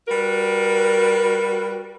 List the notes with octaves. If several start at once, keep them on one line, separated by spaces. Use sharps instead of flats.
G3 F#4 A#4 B4